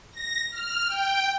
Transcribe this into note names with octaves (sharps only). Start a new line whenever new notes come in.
A#6
F6
G5